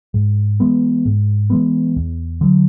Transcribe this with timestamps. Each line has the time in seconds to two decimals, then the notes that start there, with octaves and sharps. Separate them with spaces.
0.14 G#2
0.60 E3 G#3 B3
1.06 G#2
1.50 E3 G#3 B3
1.96 E2
2.41 D3 F#3